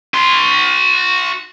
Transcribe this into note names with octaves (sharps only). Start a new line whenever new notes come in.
F#4 C6